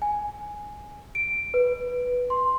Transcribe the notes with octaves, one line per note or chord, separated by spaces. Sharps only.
G#5
D7
B4
C6